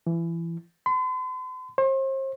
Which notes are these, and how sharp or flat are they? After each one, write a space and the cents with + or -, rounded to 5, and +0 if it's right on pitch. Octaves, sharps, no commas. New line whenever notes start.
E3 +25
C6 -45
C5 +40